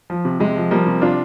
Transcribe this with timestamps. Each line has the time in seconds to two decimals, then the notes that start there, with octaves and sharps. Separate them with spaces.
0.10 F3
0.25 C3
0.40 C3 G#3
0.56 F3
0.71 F3 G3 A#3
0.86 C3
1.01 C3 D4 F4